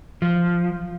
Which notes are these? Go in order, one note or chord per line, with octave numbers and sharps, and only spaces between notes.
F3